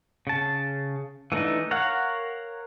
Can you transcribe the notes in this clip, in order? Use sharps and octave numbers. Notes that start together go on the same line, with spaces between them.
C#3 A5
E3 A3 D4 D#4
A#4 C#5 F5 F#5